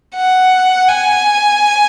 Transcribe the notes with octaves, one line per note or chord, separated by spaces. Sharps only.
F#5
G#5